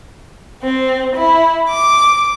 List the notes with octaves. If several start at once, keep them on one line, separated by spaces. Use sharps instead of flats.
C4
E4
D6